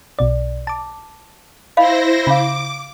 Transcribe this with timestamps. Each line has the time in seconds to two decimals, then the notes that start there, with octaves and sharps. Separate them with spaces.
0.19 B1 B2 D5
0.67 A5 D6
1.77 E4 C5 D#5 F5 B5 A#6
2.27 C#3 F4 F5 D6